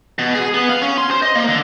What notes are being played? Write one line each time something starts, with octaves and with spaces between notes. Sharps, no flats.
B2
G#4
B3
F5
C#4
C6
C5
D#5
A#3
D3